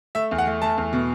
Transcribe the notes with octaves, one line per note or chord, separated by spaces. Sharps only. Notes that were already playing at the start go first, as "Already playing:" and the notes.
A3 E5
E2
F#5
A3
A3 A5
E2
B2